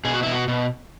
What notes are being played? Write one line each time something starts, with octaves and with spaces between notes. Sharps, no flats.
B2 G#4
F#4
B2 E4
F#4
B2